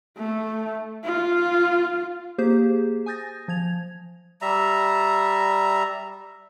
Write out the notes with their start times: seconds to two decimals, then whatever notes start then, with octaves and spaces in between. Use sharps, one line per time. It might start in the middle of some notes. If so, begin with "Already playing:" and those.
0.18 A3
1.04 F4
2.38 A#3 G4 G#4 C5 G6
3.06 G#5 D#6 G6 A6 A#6
3.48 F3 G#6 F7
4.42 G3 E5 A#5